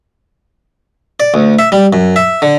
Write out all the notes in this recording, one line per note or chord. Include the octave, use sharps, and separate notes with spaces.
D5
D2
E5
G3
F#2
E5
D3